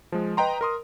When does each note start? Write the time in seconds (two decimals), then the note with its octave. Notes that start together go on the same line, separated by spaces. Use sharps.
0.12 F3 G#3
0.37 B4 D#5 G5 A#5 C6
0.61 A#4 C6 D#6